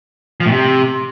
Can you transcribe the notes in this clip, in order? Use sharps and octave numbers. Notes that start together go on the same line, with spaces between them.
F3
A2
C3